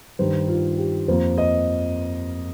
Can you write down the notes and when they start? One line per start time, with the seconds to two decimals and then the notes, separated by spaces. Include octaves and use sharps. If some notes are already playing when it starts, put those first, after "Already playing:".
0.19 G2 D#3 G3 C5
0.48 F4
0.79 G4
1.08 F2 F3 A#3 C5
1.38 D#5